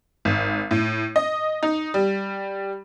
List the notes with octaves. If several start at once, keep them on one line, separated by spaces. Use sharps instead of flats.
G#1
A2
D#5
D#4
G3